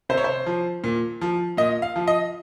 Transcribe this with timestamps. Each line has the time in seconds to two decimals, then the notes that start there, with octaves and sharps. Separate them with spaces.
0.09 C3 C5
0.17 C#5
0.24 C5
0.46 F3
0.84 A#2
1.21 F3
1.57 A#2 D#5
1.82 F5
1.96 F3
2.07 D#5